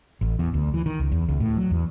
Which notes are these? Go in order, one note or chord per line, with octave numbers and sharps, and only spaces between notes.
A1
E2
D2
E3
D#3
C#2
E2
C#2
A2
F#3
E2